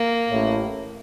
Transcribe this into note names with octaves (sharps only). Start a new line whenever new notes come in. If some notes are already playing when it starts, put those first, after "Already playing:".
Already playing: A#3
A1 A2